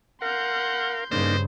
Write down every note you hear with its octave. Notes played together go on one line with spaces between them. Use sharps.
A#4 F5 F#5 C6 G6
G2 C#3 A#3 D4 D#4 C5